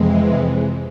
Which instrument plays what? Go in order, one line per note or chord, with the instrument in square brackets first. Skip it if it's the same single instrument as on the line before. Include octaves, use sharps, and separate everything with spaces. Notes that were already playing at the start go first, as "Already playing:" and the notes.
Already playing: [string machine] F2 C3 E3 G#3